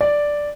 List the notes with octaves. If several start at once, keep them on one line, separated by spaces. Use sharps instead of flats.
D5